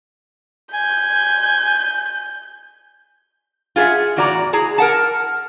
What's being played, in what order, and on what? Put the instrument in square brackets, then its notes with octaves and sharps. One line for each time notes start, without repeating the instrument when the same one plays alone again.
[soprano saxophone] G#5 [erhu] G6
[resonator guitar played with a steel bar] F4 G#4 A4 E5 F#5
E2 A2 F#4 D5 A#5
E4 G#4 A#5
A#4 F#5 A5